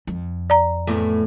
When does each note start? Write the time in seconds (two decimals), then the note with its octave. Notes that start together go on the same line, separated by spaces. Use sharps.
0.07 F2
0.50 D5 A#5
0.87 E2 A2 A3